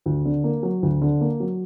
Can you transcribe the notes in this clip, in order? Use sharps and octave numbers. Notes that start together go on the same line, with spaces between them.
D2
D3
A#3
F#3
D2
D3
A#3
F#3